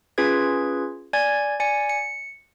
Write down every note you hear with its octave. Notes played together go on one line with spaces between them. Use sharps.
C#4 F4 G#4 B4 G#6
D5 G#5 G#6
D5 G#5 C#7
C#7